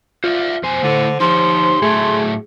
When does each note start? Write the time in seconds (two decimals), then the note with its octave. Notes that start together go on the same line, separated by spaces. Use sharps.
0.24 F4 C5 D5 E5
0.63 F2 B2 C5 G#5
0.82 D3 A3 E4 A4
1.20 F3 D#4 G4 C#5 C6
1.82 A2 F#3 A3 G#4 A4